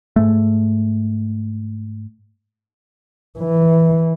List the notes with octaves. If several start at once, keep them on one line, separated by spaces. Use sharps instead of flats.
G#2 A3
E3